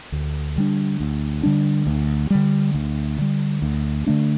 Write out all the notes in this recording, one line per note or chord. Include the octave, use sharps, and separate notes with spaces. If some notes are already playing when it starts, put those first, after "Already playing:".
D2
D3 G3 D4
D2
D3 G3 D4
D2
D3 G3
D2
D3 G3
D2
D3 A3 D4